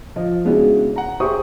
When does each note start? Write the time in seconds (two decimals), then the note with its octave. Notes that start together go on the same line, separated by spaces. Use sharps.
0.16 F3 D#5
0.45 C#3 G#3 B3 D4 E4 F#4
0.96 F#5 A#5
1.20 G4 G#4 C5 E5 C#6 D#6